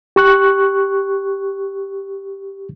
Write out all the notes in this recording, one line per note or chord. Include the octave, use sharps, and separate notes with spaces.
G4 C#6 F#6